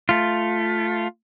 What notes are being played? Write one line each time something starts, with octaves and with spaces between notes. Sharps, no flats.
A3 F4